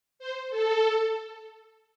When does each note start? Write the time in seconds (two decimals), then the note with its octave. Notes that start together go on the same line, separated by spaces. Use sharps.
0.19 C5
0.50 A4